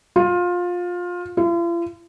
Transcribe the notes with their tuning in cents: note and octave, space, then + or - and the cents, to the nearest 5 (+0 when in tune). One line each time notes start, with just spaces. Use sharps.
F4 +20
F4 -45